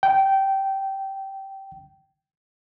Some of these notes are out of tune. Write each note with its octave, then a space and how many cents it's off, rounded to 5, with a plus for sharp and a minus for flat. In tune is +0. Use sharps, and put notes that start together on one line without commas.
G5 -15